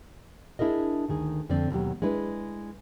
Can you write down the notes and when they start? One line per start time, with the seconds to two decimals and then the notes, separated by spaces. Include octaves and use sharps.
0.59 D4 E4 G#4 A#4 D#5
1.09 D2 D#3 G#4
1.49 F2 D3 C4 D5
1.71 D#2 B2 F#3 G4
2.02 G#3 D4 E4 B4